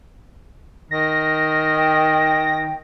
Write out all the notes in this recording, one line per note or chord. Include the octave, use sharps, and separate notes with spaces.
D#3 A#6
G5